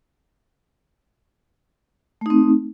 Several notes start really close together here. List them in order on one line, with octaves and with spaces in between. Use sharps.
A3 D#4 C4